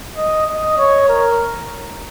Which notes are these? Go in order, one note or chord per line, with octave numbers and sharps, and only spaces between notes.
D#5
D#5
C#5
A#4